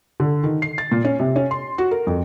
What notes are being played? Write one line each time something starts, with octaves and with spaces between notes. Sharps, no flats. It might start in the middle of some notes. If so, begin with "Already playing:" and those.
D3
D#3
C7
A6
A#2
C#4
C3
C#4
C6
F#4
A#4
F2